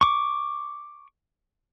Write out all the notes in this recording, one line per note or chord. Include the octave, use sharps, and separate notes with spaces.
C#6 D6